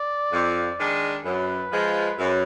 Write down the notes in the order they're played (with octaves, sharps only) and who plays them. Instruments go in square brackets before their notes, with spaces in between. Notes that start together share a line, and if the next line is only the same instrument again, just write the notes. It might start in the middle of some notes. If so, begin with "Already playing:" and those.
Already playing: [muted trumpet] D5
[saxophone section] F2
D#3 G#3 D4
[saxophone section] F#2 [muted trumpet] B4
[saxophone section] F3 G#3
F#2